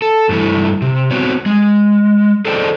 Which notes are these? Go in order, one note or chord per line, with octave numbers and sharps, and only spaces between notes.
A4
G2 E3 A3 E4
C3
B3 C4 F#4 B4 C#5
G#3
G#4 A4 C5 D5 D#5 G5